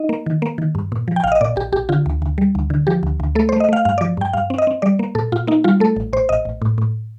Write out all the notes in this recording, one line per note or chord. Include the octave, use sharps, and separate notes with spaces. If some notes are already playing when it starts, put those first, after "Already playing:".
Already playing: D#4 D#5
A#3
D#3
A#3
D#3
G2
A#2
F3
G5
A#1 F5
D#5
A#2 D5
A#1 G4
A#1 G4
D3 F4
D2
D2
G3
D2
D3
F3 G4
D2
D2
A3 A4
A3 C5
D#5
A3 F5
G2 F5
F3 D5
G2 G5
G2 F5
C4
D#5
C4
G3 D5
A#3
A#2 A4
A#2 F4
A#3 D#4
G3 F4
A3 A4
A1
A1 C5
A1 D#5
A1
A2
A2